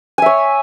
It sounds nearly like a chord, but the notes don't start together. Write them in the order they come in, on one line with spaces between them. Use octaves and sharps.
G#5 E5 C#5